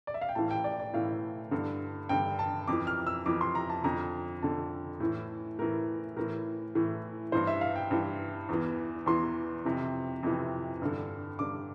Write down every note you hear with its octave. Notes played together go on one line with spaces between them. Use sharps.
D5
E5
F5
G5
A2 E3 A5
G5
D5
D5
A2 E3 F5
G2 D3
G2 D3 G5
A5
F2 E3 D6
F6
E6
F2 E3 D6
C6
A#5
A5
F2 D3 A#5
F2 D3 A5
A2 E3
A2 E3 A#4
A2 E3 A#4
A2 E3
G2 E3 C5
E5
F5
G5
G2 E3
E2 E3
E2 E3 C6
F2 C3 E3
F2 C3 E3
G2 D3
G2 D3 D6